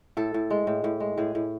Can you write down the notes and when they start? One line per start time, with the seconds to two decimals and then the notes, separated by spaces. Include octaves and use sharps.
0.17 A2 A4
0.34 A2
0.50 G#3
0.67 A2
0.84 A2
1.00 G#3
1.18 A2 G#4
1.35 A2